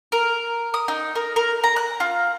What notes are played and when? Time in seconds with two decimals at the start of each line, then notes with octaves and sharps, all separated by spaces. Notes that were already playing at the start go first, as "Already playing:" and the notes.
0.12 A#4
0.74 D#6
0.88 D#4
1.15 A#4
1.36 A#4
1.64 A#5
1.76 F#6
2.00 F4